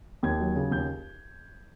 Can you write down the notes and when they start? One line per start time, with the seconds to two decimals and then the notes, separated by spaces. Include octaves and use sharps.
0.23 D#2 G#6
0.40 F#3
0.56 C#3
0.71 D#2 G6